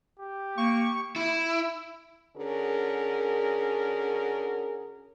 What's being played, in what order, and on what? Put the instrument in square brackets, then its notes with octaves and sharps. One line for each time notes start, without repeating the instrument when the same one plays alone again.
[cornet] G4
[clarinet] A#3 [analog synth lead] C#6
[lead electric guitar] E4
[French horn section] D3 C#4 F#4 G#4 A#4